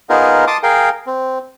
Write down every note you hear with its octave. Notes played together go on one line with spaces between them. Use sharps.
B3 D#4 F4 G#4 A#4
A5 C6 D6 D#6
G#4 A#4 F5 G5
C4